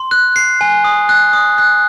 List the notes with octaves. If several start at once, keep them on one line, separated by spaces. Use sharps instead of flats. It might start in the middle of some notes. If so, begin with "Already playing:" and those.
Already playing: C6
F#6
C7
G#5
D#6
F#6
D#6
F#6